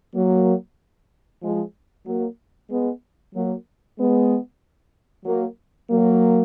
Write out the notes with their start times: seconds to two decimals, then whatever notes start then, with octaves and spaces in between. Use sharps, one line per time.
0.15 F#3 A#3
1.42 F3 G#3
2.06 F#3 A#3
2.70 G#3 B3
3.34 F#3 A#3
3.98 G#3 B3
5.25 F#3 A#3
5.89 F#3 A#3